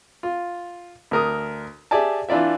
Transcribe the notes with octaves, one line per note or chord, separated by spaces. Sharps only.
F4
D2 A#4 D#6
G4 G#4 D5 E5 G#5 A5
E3 D4 F4 D5 E5